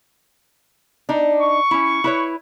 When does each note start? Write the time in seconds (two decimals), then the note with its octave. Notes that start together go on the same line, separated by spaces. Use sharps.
1.09 D4 D#4
1.41 C#6
1.71 C#4 E4
2.04 E4 B4 C#5